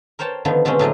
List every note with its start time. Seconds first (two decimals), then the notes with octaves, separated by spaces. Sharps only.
0.19 A#4 C5 C#5 G5 A5
0.45 D3 D#3 F3 B3
0.65 B2 D3 G#3 C4 C#4
0.79 A2 D3 F#3 D#5